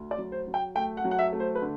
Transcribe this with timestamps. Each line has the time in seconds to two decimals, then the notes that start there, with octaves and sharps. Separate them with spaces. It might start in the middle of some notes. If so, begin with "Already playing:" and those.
Already playing: D2
0.11 D5
0.18 F#3
0.32 C5
0.47 F#3
0.54 G5
0.75 A3 G5
0.97 F#5
1.04 F#3
1.11 F#5
1.19 E5
1.33 A3
1.40 C5
1.55 B4
1.62 D3